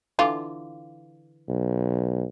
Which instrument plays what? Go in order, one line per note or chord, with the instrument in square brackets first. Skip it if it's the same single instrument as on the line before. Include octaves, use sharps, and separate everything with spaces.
[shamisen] D3 E3 F4
[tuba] B1